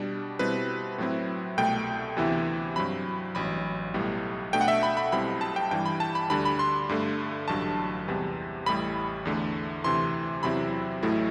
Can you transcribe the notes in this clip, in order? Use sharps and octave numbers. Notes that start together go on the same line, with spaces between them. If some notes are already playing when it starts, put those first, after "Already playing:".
Already playing: B2 G3 D4
B2 G3 C4 E4 B4
A2 F#3 C4 E4
C2 B2 A3 G5
D2 C3 E3 B3 E4
G2 F#3 C4 B5
A1 G2 F#3 B5
B1 A2 G3 B3
B2 A3 D4 G5
F#5
E5
B5
B5
B1 B2 G3 C4 E4 B5
A5
G5
G2 E3 G3 G5
B5
A5
B5
D2 D3 G3 D4 B5
B5
C6
G2 D3 A3
A1 G2 D3 F#3 A5
E2 C3 G3 B3
A1 A2 G3 B5
E2 D3 A3
D2 C3 E3 C6
E2 C3 F#3 C4 E4 B5
A1 A2 F#3 A3 E4